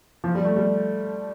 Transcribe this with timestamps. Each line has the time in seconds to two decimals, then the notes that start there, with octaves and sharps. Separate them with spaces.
0.24 F3
0.35 G3
0.45 A3
0.56 G3